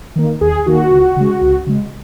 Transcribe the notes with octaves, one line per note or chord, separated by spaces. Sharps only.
D#3 A#3
D#2 G#4
D#3 A#3 F#4
C#2
C#3 G#3
C#2
C#3 G#3